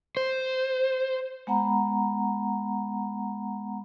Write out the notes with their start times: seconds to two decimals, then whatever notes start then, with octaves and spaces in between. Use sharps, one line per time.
0.17 C5
1.47 G#3 B3 F#5 A#5 B5